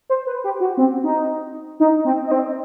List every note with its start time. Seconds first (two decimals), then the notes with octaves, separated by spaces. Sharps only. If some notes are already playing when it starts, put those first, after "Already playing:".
0.10 C5
0.27 B4
0.44 G4
0.60 F#4
0.77 C4
1.04 D#4
1.80 D#4
2.05 C4
2.27 D#4
2.31 C4